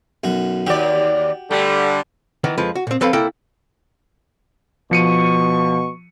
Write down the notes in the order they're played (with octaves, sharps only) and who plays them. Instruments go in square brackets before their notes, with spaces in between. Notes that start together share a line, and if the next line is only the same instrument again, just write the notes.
[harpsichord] B1 F#2 F#4
[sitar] D#2 D5 [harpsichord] F#4 G4
[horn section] D3 G3 [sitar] A3
[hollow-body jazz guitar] D#3 E3 B3
F2 F3 G#3 B4
F#4
A#2 C4
F3 C4 A4 B4 F5 B5
C2 A#3 E4 A4 G5
[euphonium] B2 [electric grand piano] F3 C#7 D#7 [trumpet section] C#6